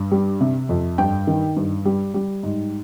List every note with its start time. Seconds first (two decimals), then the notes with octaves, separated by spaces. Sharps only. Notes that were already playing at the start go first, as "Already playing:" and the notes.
Already playing: G2
0.11 G3
0.41 C3
0.69 F2
0.98 G2 G5
1.27 D#3
1.56 G2
1.85 G3
2.14 G3
2.43 G#2